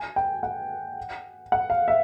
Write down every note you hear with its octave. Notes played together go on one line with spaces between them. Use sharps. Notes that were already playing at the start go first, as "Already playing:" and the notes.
Already playing: G#5
G5
F#5
F#5
F5
E5